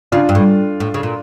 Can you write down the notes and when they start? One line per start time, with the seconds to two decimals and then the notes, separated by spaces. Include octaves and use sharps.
0.12 C#3 D4 F4
0.29 G2
0.35 A2
0.80 A2
0.94 C#3
1.03 A#2